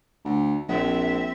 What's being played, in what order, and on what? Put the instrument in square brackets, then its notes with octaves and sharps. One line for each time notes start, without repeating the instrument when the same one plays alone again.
[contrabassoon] D2
[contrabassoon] A#1 [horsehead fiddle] C4 E5